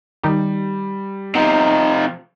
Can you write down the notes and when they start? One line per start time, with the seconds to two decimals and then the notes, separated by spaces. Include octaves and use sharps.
0.23 D#3 G3 D#4 G4
1.35 C3 F3 B3 D#4